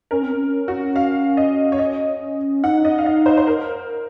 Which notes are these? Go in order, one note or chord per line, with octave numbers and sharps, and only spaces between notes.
C#4 A#4
C4
C#4
F#4
F5
D#5
C#5
D#5
D#4 F#5
D#5
F5
D#5
C5
C5
A#4